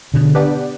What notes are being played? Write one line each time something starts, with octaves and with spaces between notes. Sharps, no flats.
B2 D3
B3 D4 G4 B4 D5